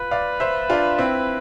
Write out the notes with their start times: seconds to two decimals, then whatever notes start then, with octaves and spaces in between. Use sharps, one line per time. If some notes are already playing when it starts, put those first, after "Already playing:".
Already playing: F4 B4
0.11 D5 F5
0.40 C5 E5
0.70 D4 F4
0.98 C4 E4